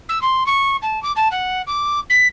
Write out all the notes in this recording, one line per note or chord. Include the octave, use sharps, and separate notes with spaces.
E6
C6
C#6
A5
D6
A5
F#5
D6
B6